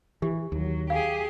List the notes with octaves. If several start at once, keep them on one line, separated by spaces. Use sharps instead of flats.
E3 G4
D#2 F#3
G4 G#4 F5